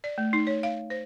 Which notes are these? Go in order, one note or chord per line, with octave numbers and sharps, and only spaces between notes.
D5
A3
D#4
C#5
F5
C5